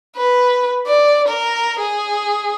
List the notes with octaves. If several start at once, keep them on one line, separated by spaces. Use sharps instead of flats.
B4
D5
A#4
G#4